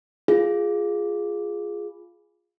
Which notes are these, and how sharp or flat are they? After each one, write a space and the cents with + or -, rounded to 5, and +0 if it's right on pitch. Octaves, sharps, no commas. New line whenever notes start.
F4 +0 G#4 +0